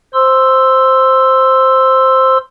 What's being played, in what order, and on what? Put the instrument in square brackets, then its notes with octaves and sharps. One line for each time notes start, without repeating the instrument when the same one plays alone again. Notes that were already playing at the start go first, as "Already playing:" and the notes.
[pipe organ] C5 C6 E6